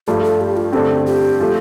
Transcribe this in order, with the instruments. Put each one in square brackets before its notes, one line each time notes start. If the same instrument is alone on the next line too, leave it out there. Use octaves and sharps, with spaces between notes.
[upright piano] G2 F3 A3 [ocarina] G4
[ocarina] A4
G4
F4
[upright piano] G2 D3 A3 C4 [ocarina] G4
[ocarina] G4
[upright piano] F3 A3